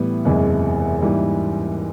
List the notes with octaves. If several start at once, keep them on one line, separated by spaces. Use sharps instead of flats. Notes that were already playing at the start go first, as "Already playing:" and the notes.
Already playing: A2 E3 G3 B3
F#1 E2 C3 E3 G#3
G#2 E3 G3 A#3